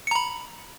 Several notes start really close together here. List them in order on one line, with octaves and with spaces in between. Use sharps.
C#7 A#5 B5